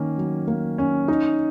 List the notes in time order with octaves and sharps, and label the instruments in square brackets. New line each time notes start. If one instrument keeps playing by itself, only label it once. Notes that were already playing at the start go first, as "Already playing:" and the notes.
Already playing: [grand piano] D#3 A#3 C#4
F#3
A#3
C#4
D#4